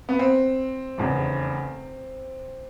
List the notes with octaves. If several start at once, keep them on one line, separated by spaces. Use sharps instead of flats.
B3
C4
F1 E2 C#3